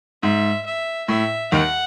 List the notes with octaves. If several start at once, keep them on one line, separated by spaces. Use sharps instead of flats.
G#2 E5
E5
A2 E5
D#2 D#3 F#5